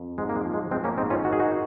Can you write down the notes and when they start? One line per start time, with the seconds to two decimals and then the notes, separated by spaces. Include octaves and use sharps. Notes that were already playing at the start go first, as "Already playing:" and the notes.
Already playing: F2
0.18 G#2 G#3
0.29 A#3
0.36 G#3
0.45 F3
0.54 G#3
0.71 F3 G#3 C4
0.84 A#3 C#4
0.98 G#2 C4 D#4
1.10 C#4 F4
1.24 D#3 F#4
1.33 G#4
1.40 D#4 F#4